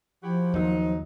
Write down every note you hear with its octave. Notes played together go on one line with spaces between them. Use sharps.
F3 E4 F#4 G4
D#2 F#3 D#4